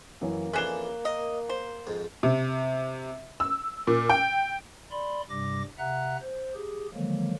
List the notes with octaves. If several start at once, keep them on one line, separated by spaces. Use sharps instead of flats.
F#2 E3 A#3
F2 E3 C#4 D4 G#4 F#6 E7 G7
A#4 D#5
C5
F2 G#2
C3
E6
A#2
G5
D5 B5 C6
G2 C3 G3 D6 A#6
C3 E5 F#5 A#5 F#6
C5
G4 G#4
D3 D#3 F3 F#3 G#3 A#3